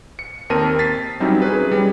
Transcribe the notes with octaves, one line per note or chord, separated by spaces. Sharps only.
C#7
D#2 C4 A#4 A5 D#7
A6 B6 C7
F#3 G3 C4 C#4 D#4 E4
G#4 B4
G3 C#4